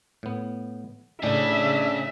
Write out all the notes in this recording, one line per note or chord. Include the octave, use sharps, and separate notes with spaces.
A2 B3
A2 C#4 D4 G#4 E5